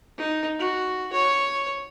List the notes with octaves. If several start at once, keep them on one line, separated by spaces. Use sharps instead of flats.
D#4
F#4
C#5